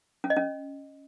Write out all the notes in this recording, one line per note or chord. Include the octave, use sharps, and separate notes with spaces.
C#4
D#5
C#4